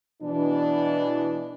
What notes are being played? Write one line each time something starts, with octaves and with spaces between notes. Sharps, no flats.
B2 E3 D4